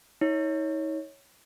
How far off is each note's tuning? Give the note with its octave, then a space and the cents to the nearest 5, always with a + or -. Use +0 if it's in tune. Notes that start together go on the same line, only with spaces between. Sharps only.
D#4 +45 C#5 +0